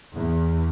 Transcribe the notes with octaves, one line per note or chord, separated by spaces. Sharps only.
E2